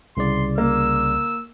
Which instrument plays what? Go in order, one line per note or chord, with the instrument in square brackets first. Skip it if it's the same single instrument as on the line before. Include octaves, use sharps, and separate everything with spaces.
[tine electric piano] C2 C#3 D5 [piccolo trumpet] C6
[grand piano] A#3 [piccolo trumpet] E6